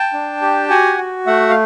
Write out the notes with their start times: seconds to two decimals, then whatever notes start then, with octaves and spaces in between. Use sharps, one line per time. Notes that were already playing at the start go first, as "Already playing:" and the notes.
Already playing: G5 A5
0.13 D4
0.42 G4
0.70 F#4 F#5 G#5
0.98 F#4
1.27 A3 E5 F#5
1.49 F5